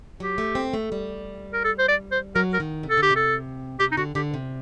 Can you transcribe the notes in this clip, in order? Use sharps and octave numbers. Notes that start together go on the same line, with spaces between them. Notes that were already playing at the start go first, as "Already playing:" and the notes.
F#3 G4
A3
C4
A3
G3
A#4
A4
C5
D5
C5
F#3 A#4
A#4
D#3
C3
A4
D3
G4
C3
A4
C3 G4
D#4
D3 F#4
D3 G4
C3